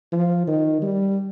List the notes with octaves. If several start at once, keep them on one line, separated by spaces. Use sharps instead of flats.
F3
D#3
G3